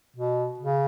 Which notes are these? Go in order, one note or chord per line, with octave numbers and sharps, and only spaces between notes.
B2
C#3